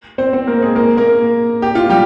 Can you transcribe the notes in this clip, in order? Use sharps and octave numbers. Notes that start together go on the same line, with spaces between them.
C4 C5
C4 C5
A#3 A#4
G#3 G#4
A#3 A#4
A#3 A#4
G4
F4
G3 G4